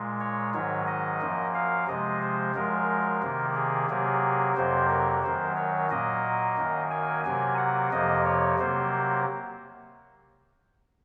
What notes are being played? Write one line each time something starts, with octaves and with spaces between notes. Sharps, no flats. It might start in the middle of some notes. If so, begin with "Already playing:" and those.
Already playing: A#2 G#3
C#5
G#2 D#3 F#3 C#5
D#5
F#2 F3 A#3
F5
C3 F3 G#3 D#5
C5
F#2 F3 G#3 A#4
C3 D#3 A#3
G#4
C3 F#3 A#3 G#4
F2 C3 F#3 A#3 C5
A#4
F#2 D#3 F#3 C5
C#5
A#2 F#3 A#3 D#5
F#2 D#3 A#3
G#5
C3 F#3 A#3 G#5
F#5
F2 C3 F3 A#3 D#5
C#5
C3 F#3 A#3 C5